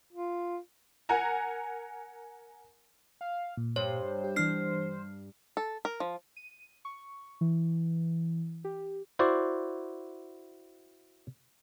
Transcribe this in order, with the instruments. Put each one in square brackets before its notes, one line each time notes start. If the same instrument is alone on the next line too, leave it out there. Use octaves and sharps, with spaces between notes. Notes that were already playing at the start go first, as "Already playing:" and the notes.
[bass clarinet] F4
[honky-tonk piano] A#4 F#5 G#5 A#5
[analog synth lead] F5
[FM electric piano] A#2
[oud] G2 [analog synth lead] C5 [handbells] C#5
[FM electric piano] G4
[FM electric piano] E3 D4 [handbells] F6 C7
[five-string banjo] A4
A#4
F3
[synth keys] D#7
C#6
E3
G4
[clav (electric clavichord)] E4 F#4 C5 D5